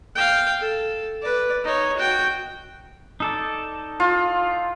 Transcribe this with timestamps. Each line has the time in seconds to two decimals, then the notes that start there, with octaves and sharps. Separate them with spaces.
0.15 F5 G5
0.61 A4
1.22 B4 D5
1.64 D#4 C#5
1.97 F#4 G5
3.20 D#4 A4 D5
4.00 F4